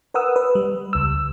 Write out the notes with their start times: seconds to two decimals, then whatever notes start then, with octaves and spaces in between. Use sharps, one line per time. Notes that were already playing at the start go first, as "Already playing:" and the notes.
0.14 A#4 B4 F#5 D#6 E6
0.36 B4
0.55 G3
0.93 C#2 E6